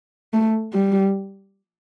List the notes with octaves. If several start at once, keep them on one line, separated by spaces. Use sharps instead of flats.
A3
G3